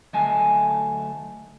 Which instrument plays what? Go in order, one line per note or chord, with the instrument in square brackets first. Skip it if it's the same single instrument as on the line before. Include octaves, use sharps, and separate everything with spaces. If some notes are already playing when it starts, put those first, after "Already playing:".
[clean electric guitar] D2 F#3 A3 D#4 A4 G#5